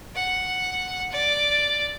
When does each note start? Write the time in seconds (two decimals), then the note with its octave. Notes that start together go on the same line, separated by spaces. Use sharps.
0.15 F#5
1.12 D5